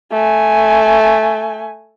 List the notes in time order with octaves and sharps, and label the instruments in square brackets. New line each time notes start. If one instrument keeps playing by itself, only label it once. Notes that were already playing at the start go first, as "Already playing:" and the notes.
[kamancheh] A3 G#5